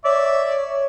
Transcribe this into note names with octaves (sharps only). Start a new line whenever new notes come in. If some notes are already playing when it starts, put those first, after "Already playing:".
C#5 D5 E5